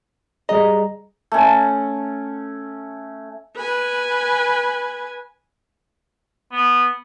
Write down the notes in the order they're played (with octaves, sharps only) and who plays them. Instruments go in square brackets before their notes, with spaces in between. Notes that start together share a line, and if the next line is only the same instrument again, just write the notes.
[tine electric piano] G3 G#4 A#5 [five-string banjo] D#5
[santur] A3 C#4
[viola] B4 G#5
[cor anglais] B3